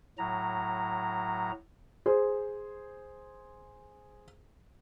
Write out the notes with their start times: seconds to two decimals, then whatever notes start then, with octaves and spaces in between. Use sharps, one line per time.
0.18 A2 F#3 A#5
2.06 G#4 C5